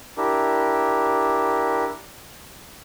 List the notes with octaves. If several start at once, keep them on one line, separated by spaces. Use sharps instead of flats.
D4 E4 G4 A#4